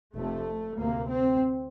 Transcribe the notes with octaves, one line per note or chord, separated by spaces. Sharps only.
F1 F2 C3 A3
D2 C3 A#3
C4